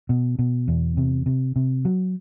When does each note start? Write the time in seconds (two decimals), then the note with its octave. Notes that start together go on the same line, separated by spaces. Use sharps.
0.09 B2
0.39 B2
0.68 E2
0.97 C3
1.26 C3
1.56 C3
1.85 F#3